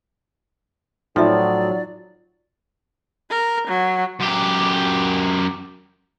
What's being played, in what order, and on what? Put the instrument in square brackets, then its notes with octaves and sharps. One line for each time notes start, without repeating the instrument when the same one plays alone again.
[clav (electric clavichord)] A2 F3 [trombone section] F#3 [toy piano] D#4 F4 E5 [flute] D5
[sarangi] A#4
F#3
[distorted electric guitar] F#2 G4